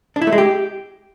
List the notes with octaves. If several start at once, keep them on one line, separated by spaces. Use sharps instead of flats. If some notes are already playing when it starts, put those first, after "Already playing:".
D4
E4
A3
G#3
G4